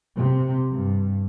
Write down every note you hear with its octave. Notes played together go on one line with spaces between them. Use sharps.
C3
G2